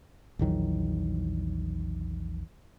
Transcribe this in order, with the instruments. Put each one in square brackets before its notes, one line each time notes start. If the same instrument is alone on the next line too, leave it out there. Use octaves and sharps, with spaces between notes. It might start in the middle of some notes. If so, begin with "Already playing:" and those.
[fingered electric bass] A#1 E2 D#3 F#3